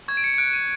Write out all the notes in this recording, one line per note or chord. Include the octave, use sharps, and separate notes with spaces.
C#6 G#6
D7
C#7
C#7
F#6 D7
D#7